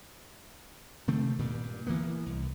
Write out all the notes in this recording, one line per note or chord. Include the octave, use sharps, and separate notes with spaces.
C3 D#3 A3 C4
G2 A#2
E3 F#3 A#3 B3
C2